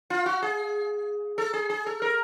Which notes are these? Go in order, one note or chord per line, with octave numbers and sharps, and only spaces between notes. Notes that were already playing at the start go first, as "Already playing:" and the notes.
F4
F#4
G#4
A4
G#4
G#4
A4
A#4